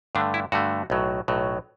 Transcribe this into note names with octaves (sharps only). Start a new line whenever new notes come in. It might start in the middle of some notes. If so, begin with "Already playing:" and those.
G2 D3 A3 D4
E4
G2 D3 A3 F#4
B1 A2 F#3
B1 A2 F#3